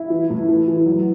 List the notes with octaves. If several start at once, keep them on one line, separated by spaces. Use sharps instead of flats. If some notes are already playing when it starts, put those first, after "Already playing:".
Already playing: E4
E3
A2
E3
E3
F#3